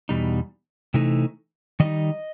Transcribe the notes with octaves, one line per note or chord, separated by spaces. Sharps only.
E2 B2 G3 D#4
C3 E3 A3 D#4
D#3 G3 D#4 D#5